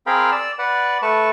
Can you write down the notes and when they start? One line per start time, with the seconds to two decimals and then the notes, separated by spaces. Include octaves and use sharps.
0.07 C4 G#4 A#4 F5 G5 B5
0.32 D5 E6
0.59 B4 D5 F#5
1.02 A3 B4 A5 C#6